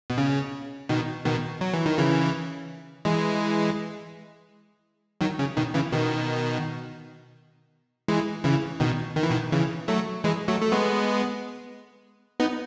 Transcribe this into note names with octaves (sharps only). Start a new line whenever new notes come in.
B2
C#3
B2 D#3
B2 D#3
F#3
E3
D#3
C#3 E3
E3 G#3
D#3 F#3
C#3
B2 D#3
C#3 E3
B2 D#3
E3 G#3
C#3 E3
B2 D#3
D#3
E3
B2 D#3
C#3 E3
F#3 A3
E3 G#3
F#3 A3
A3
G#3 B3
B3 D#4